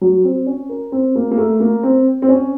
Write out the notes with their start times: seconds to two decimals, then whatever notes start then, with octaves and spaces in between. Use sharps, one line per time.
0.01 F#3
0.24 C4
0.46 C#4
0.69 A#4
0.92 C4
1.15 A#3
1.31 A#3
1.38 A3
1.60 A#3
1.83 C4
2.22 C4
2.29 C#4